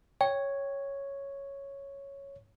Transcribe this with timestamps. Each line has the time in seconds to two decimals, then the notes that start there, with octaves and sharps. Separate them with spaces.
0.21 C#5 G5